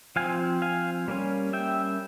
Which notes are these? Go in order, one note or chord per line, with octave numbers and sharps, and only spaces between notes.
F3 C4 F5 G#5
F5 G#5
G3 A#3 C#4
E5 G5